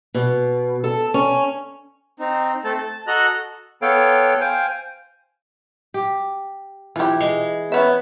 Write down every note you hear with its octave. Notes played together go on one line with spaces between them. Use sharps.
B2
A4
C#4
C4 D#4
A3 C4 A4 A5
A5
F#4 A4 D#5 A#5 F#6
B3 A4 C#5 F5 G5
C5 F5 G5 G#5
G4
E3 E4 F4 G4
G#3
B3 C#4 C#5 E5